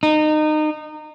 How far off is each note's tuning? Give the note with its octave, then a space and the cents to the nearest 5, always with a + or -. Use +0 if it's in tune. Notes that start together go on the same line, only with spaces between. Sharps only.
D#4 -25